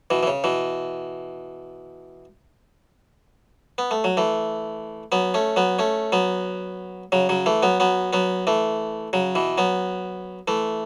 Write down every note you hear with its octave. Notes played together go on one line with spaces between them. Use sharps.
B2 E3
E3
C#3
B2 E3
B3
A3
F#3
E3 A3
F#3 B3
A3 C#4
F#3 B3
A3 C#4
F#3 B3
C#3 F#3
C#3 F#3
E3 A3
F#3 B3
F#3 B3
F#3 B3
E3 A3
C#3 F#3
B2 E3
F#3 B3
E3 A3